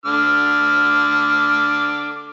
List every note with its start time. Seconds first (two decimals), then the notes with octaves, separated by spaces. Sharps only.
0.06 D3 D6 F6